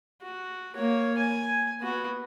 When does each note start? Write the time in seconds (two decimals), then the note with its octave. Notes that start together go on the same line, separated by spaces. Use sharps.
0.22 F#4
0.76 A#3 C#5
1.18 G#5
1.81 B3 F#4